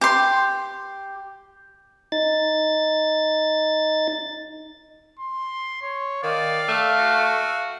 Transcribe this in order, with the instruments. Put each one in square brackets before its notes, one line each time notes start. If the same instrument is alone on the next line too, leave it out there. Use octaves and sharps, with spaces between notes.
[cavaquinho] G4 C6
[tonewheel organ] D#4 A6
[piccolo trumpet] C6
C#5
[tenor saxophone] D#3 [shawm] D5 [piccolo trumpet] F5
[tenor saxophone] A3
[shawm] F#4